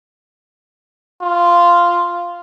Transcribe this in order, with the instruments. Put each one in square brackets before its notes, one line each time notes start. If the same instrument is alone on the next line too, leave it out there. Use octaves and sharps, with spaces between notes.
[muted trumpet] F4